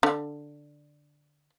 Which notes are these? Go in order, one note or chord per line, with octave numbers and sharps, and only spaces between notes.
D3